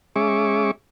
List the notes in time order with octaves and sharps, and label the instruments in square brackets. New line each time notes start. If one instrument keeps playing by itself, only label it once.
[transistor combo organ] G#3 C#4 G#4 E5 C#6 D6